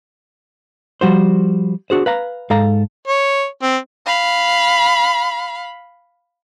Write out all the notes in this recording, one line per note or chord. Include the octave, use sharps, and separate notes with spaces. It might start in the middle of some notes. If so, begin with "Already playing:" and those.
F3 G3 F#4 C5
D4 F#4 G#4 C5
B4 F5 A#5
G#2 A4 F5 A#5
C#5
C4
F5 B5